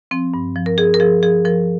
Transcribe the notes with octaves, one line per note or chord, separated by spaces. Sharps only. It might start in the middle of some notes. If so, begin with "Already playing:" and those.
F3 C4
G2
F3
A#4
F3 G#4
A#4
F3 G#4
F3 G#4
F3 A#4